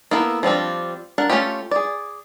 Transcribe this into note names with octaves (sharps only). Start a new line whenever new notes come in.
A#3 B3 E4 A4
F3 G3 C4 D4
D4 A#4 F#5
A3 A#3 C#4 F4 G4
G#4 D5